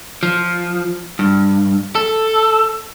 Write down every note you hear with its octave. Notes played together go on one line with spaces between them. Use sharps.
F3
G2
A4